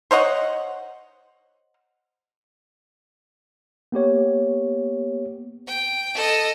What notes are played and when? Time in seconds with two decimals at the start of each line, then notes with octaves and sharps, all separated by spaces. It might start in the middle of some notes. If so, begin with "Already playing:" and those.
0.11 C5 C#5 D#5 F#5
3.92 A#3 B3 G4 C#5
5.67 G5
6.14 A4 D#5